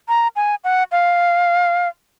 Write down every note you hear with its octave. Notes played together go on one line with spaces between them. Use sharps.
A#5
G#5
F#5
F5